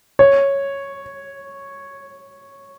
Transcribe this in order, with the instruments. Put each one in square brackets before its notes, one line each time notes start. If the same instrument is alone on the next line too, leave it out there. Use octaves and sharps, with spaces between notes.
[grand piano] C#5